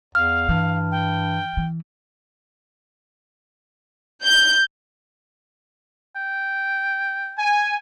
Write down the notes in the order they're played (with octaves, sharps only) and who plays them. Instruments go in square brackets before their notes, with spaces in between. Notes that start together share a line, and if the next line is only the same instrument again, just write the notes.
[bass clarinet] E2 [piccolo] F5 [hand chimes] F6
[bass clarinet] G2 [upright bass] E3
[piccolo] G5
[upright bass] E3
[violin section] G6
[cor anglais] G5
[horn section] G#5